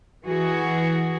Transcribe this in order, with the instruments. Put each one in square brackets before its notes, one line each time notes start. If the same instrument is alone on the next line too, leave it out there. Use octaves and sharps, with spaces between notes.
[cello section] E3 F#4 G#4